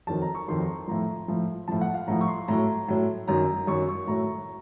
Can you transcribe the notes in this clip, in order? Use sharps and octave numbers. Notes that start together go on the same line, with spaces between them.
F2 D#3 F#3 A5
A#5
C#6
F2 D#3 F#3 C6
A#5
A2 F3 A#5
A2 F3
A2 F3 A5
F#5
F5
A2 F3 A#5
C#6
C6
A2 F#3 A#5
A2 F#3
F#2 D#3 F#3 A#5
F#2 D#3 F#3 C#6
C#6
A2 F#3 A#5